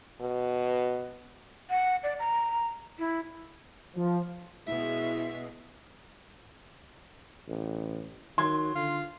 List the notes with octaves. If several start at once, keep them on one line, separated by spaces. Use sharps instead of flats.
B2
F#5
D5
A#5
E4
F3
B2 G#3 E4 E5
A1
D#3 F#3 C6 G#6
D3 F4